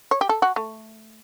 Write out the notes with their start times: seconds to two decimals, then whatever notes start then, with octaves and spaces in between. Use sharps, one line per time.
0.11 C#5
0.21 G4
0.29 A4
0.42 F#4
0.56 A3